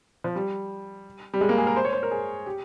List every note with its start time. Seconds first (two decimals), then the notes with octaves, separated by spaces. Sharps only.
0.24 F3
0.36 G3
1.34 G3
1.41 G#3
1.49 A#3
1.58 G#4
1.67 A#4
1.76 C5
1.85 C#5
1.93 C5
2.03 A#4
2.11 G#4
2.46 G4